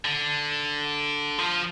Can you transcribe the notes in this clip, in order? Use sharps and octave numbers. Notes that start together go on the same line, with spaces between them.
D3
F3